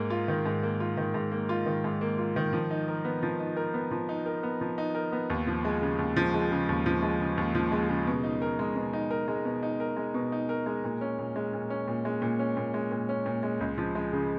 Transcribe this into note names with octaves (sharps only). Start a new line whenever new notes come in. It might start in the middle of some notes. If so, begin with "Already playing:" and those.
Already playing: G#2 A#3
F4
D#3
G#2
A#3
F4
D#3
G#2
A#3
F4
D#3
G#2
A#3
F4
D#3
F3
D#4
A#4
B3
F3
D#4
A#4
B3
F3
D#4
A#4
B3
F3
D#4
A#4
B3
D#2
F3
G#3
C#3
D#2
F3
G#3
C#3
D#2
F3
G#3
C#3
D#2
F3
G#3
C#3
B2
D#4
A#4
G#3
B2
D#4
A#4
G#3
B2
D#4
A#4
G#3
B2
D#4
A#4
G#3
A#2
C#4
A#2
G#3
A#2
C#4
A#2
G#3
A#2
C#4
A#2
G#3
A#2
C#4
A#2
G#3
C#2
F3
G#3
C#3